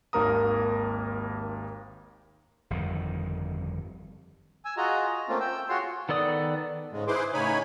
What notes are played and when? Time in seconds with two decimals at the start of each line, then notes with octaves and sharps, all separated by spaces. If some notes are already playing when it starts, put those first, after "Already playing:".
0.13 G#1 D#2 A#3 A#4 A#5 D#6
2.70 G1 F2 D#3
4.65 G#5 E6
4.77 F4 F#4 G#4 D#5 A#5
5.07 D#5
5.28 A3 A#3 C4 C#4 F4
5.40 G5 E6
5.69 F4 F#4 G#4 C#5 C6
6.09 D#3 B3 A4 D5 D#6
6.92 G#2 C#3 G#3
7.07 E4 G#4 B4 C5 C6 D6
7.34 A2 C#3 D#4 C#5 G#5 B5